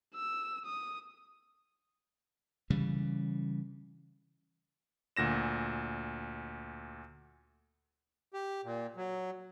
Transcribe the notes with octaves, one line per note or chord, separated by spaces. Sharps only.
E6
D#6
C#3 E3 G3
D2 A#2 A#6 E7
G4
A#2
F#3